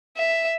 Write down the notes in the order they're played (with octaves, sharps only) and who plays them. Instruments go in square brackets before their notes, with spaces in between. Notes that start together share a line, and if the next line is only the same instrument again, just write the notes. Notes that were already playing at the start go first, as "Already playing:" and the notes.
[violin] E5